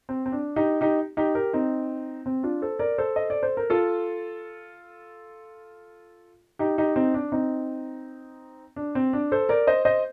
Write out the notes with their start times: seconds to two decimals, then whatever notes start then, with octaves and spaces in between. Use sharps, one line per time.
0.09 C4
0.26 C4
0.32 D4
0.56 D#4 G4
0.81 D#4 G4
1.17 D#4 G4
1.35 G4 A#4
1.53 C4 D#4
2.26 C4
2.43 D4 F4
2.62 A4 C5
2.79 A#4 D5
2.98 A4 C5
3.16 D#5
3.30 D5
3.43 C5
3.57 A#4
3.70 F4 A4
6.59 D#4 G4
6.78 D#4 G4
6.96 C4 D#4
7.14 D4
7.32 C4 D#4
8.76 D4
8.95 C4
9.13 D4
9.32 A4 C5
9.49 A#4 D5
9.67 C5 D#5
9.85 C5 D#5